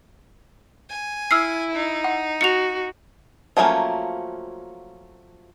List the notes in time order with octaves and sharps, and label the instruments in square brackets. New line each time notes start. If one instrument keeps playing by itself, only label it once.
[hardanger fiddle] G#5
[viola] E4 [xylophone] E6 F6 C7
[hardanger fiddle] D#4
[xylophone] F#5
[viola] F#4 [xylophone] C#7 F7
[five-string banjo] F3 F#3 A3 A#3 C#4